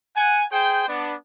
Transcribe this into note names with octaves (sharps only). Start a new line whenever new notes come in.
F#5 G#5
G#4 C5 G5
B3 D4